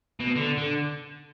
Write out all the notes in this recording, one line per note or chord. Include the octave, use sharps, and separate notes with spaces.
B2
D3
D3